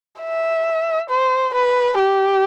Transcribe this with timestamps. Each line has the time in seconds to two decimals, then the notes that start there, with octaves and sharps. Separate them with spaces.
0.21 E5
1.10 C5
1.54 B4
1.99 G4